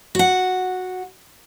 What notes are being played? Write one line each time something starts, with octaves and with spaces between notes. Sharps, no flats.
F#4 F#5